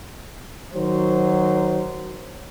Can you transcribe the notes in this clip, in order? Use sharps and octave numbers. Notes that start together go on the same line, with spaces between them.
D#3 F#3 C5